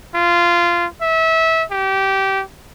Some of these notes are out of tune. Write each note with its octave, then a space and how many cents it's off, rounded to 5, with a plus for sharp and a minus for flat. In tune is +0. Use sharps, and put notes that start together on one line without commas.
F4 -15
E5 -25
G4 -20